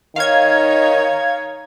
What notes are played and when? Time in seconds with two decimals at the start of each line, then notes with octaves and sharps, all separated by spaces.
0.16 D#3 D#4 C#5 F5 G#6